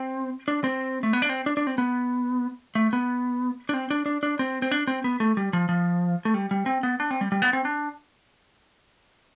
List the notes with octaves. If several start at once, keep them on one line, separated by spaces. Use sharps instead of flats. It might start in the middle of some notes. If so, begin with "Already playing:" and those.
Already playing: C4
D4
C4
A3
B3
D4
C4
D4
D4
C4
B3
A3
B3
D4
C4
D4
D4
D4
C4
C4
D4
C4
B3
A3
G3
F3
F3
A3
G3
G3
C4
B3
D4
C4
G3
G3
B3
C4
D4